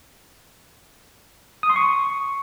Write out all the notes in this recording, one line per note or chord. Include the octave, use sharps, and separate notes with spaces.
D#6
C6
C#6